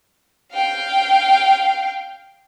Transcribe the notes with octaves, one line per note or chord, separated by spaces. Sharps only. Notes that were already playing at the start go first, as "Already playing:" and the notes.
F5 G5